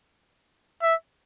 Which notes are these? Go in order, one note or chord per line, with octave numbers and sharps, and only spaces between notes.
E5